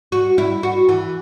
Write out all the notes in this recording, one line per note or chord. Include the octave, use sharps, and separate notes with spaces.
F#4
E4
F#4
E3